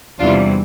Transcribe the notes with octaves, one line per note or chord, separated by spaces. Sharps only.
E2 C3 E3 G3 D4 F4